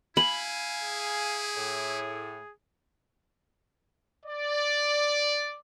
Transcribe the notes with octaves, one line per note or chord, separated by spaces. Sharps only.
E4 F5 G#5 B5
G#4
A2
D5